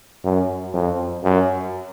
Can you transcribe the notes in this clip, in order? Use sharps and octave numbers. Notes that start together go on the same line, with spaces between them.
F#2
F2
F#2